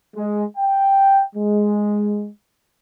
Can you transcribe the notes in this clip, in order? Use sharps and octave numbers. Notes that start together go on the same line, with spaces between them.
G#3
G5
G#3